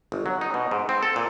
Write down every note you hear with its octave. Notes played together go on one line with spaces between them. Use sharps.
G1
F#3
D#4
B2
G#2
C4
A4
A#2